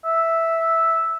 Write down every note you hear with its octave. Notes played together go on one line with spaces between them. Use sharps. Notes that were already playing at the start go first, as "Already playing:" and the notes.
E5